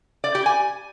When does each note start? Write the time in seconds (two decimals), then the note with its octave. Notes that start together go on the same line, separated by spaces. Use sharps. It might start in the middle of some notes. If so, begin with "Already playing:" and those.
0.24 D5
0.35 G4
0.46 G#5